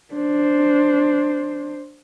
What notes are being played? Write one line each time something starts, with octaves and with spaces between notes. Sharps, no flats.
D4 C5